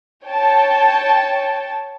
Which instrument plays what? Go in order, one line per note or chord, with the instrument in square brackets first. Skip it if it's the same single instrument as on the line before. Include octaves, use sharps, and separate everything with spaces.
[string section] C#5 G5 A5